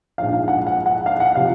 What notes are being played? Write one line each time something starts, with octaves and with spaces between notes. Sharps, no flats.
A#1 G#2 F3 F5
F5
F#5
F#5
F#5
F5
F#5
C3 F3 F5